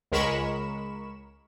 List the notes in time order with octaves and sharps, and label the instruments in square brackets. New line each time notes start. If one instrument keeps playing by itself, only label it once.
[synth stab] C#2 G#3 A#4 B5 C#6 E7